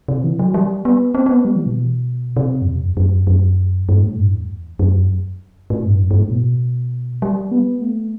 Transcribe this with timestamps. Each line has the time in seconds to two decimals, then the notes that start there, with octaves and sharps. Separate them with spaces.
0.08 C3
0.24 E3
0.39 F#3
0.54 G3
0.85 B3
1.15 C4
1.26 C4
1.31 B3
1.45 G3
1.56 E3
1.66 B2
2.37 C3
2.62 F#2
2.67 E2
2.82 F#2
2.97 F#2
3.27 F#2
3.89 G2
4.03 A2
4.18 G2
4.34 E2
4.79 F#2
5.70 A2
5.85 G2
6.00 F#2
6.11 G2
6.21 A2
6.31 B2
7.22 G3
7.52 B3
7.82 A3